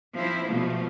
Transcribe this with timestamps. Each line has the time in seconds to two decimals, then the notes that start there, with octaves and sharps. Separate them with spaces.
0.15 F3 C4 E4 C5
0.48 B2 F3 G3 A3 A#3